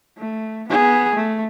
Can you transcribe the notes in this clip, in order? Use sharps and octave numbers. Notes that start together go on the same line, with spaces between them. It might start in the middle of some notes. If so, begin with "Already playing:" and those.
A3
B3 G#4
A3